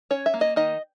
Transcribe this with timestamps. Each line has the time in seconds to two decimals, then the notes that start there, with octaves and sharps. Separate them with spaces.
0.10 C#4 C#5
0.26 E5
0.34 A#3
0.41 D#5
0.56 D#3 D#5